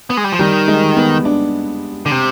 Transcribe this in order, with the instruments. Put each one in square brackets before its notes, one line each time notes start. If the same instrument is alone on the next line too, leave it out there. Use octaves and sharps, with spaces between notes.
[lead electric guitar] B3
G#3
G3
F3
[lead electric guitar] D#3 [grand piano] G3
[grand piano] G#3
B3
D4
[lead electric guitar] D3
C3